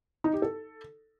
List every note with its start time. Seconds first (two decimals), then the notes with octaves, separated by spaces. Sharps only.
0.24 D#4
0.33 G4
0.42 A4